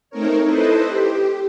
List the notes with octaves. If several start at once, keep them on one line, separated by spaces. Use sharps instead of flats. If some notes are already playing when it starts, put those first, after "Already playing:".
A3 C4 D#4 A#4 C#5
E4 A4 B4 C5 D#5
G4